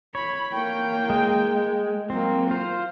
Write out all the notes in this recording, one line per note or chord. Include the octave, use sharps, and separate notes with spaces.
C#5 B5
A#3 G5
G#3
F#3 A#3 C4
F4 C5